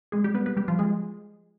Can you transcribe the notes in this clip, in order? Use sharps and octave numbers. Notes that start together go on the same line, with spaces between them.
G#3 G#4
G3 G4
B3 B4
B3 B4
G3 G4
F3 F4
G#3 G#4